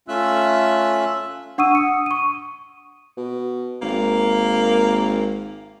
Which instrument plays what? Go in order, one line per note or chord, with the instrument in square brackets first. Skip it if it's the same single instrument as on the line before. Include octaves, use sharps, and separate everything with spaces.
[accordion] A3 C#4 F4 E5 E6 F#6
[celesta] D4 F#5 C#6 D#6 E6 D#7
D#6 C#7
C#6 D#7
[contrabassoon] B2
[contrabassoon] G#1 [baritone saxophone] A#3